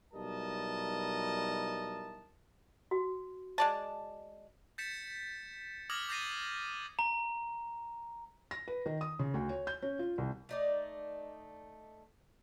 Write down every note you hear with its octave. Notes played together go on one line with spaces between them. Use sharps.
B1 G3 E4 A#4 D#5 A5
F#4
G#3 D5 A5
G6 A6 B6 C#7 E7
D6 D#6 F6 G#6 A#6 F#7
D6 G6 A6 A#6 C7 D#7
A#5
A#6
B4
D#3
D#6
C#3
D2
C#5
G6
C#4
F4
C2
A3 D#4 D5